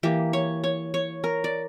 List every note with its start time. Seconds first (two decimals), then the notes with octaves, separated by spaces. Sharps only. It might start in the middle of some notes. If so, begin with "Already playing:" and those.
0.03 E3 A#3 G4
0.33 C#5
0.64 C#5
0.94 C#5
1.24 A#4
1.44 D5